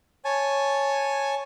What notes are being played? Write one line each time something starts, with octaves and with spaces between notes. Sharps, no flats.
C#5 G#5 A5